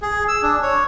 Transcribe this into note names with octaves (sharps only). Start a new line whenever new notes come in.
G#4
E6
D4
C#5